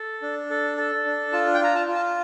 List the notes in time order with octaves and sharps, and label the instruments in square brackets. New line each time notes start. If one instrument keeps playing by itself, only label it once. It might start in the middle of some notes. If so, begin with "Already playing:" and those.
Already playing: [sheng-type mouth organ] A4
D4
A4
A4
D4
F4 A5
G5
F4 A#5
A5
F4
A5